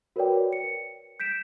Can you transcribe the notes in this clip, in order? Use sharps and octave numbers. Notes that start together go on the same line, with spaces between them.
F#4 A#4 B4 C#5 D5 G5
C#7
G6 B6 D7 E7